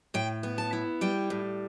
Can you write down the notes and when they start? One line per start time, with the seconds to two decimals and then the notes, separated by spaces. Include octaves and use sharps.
0.14 A2 G5
0.43 B3
0.58 A5
0.73 E4
1.01 G3 G5
1.30 A2